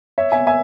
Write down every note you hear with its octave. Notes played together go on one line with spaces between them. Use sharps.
C#5 E5
E5 G#5
E5 G#5